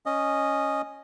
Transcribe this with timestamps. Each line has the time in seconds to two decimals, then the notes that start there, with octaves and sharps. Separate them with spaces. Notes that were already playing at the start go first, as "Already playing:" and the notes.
0.06 C#4 D#5